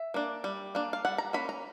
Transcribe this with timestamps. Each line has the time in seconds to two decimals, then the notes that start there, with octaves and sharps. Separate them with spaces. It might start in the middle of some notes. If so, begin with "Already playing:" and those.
Already playing: E5
0.14 A#3 D4
0.44 G3
0.75 A#3 D4
0.93 F5
1.05 G3 F#5
1.18 A#5
1.33 A#3 C#4 B5
1.49 A#5